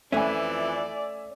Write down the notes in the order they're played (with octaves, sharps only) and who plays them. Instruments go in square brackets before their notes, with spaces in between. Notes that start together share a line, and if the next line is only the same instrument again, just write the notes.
[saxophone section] F2 E3 [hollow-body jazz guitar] A3 C#4 [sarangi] D5 [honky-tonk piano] E5 G#5